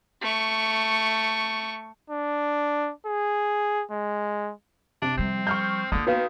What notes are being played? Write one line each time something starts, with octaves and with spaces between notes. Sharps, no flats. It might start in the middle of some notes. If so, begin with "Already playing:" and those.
A3 C#6
D4
G#4
G#3
C3 D4
F3 G3 C4
C#6 F6 G6
D3 A#3 F4 D#6
D#3 B3 F#4 B4 F5